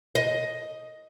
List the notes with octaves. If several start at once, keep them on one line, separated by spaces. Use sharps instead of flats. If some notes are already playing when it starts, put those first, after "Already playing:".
D#5